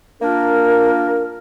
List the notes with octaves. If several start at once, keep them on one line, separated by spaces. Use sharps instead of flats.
A#3 D4 F4 A#4